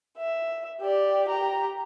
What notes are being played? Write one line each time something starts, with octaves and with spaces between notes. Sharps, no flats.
E5
G4 D5
G4 A#5